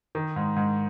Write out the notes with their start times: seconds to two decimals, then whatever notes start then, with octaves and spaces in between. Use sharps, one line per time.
0.15 D#3
0.36 G#2
0.56 G#2